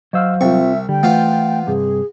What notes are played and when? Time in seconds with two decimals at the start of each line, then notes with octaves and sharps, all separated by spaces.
0.13 F#3 C5 D#5 F5 E6 F6
0.41 C2 C4 F4 E5 C#6
0.89 D3 G3 G5
1.03 E3 A3 B3 F4 C5
1.67 G2 C3 G#4